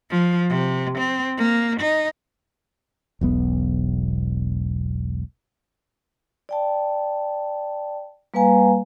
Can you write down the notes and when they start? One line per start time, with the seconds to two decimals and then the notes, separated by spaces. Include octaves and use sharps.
0.10 F3
0.50 C3
0.98 C4
1.37 A#3
1.80 D#4
3.21 E1 B1 B3
6.49 D5 G5 A5
8.34 G3 A#3 B4 F5 G#5 A#5